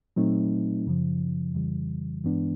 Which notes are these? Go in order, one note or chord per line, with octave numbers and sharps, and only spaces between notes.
A#2 F#3 A3 C4 D#4
F#2 C#3 F3
F2 C#3 E3 G3
G2 E3 G#3 B3 D4